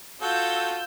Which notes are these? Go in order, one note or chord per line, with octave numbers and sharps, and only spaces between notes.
F4 F#4 A4 E6 G6